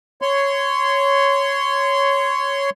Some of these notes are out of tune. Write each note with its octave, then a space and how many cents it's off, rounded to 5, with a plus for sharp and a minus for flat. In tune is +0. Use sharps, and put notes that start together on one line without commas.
C#5 +0 C6 -15